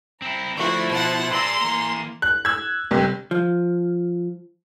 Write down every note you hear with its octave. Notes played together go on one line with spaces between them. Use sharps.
C4 E4 A#5
D3 F3 A3 E4 F#4 C5
B2 F#5 A5
G#4 D5 A5 A#5 C6 E6
E3 A#3 A#5
F#6
E6 G#6
G1 C3
F3